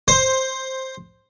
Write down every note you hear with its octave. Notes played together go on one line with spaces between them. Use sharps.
C5